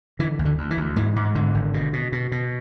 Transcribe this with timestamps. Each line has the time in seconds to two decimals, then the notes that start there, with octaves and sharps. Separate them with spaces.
0.19 D3 E3
0.39 D2
0.45 D3
0.58 D2
0.71 E3
0.77 D2
0.96 G#2 E3
1.16 G#2
1.35 G#2 D3
1.55 G#1
1.74 B2
1.93 B2
2.12 B2
2.32 B2